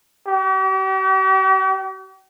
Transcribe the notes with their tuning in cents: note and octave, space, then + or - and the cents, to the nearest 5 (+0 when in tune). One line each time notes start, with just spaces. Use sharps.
G4 -45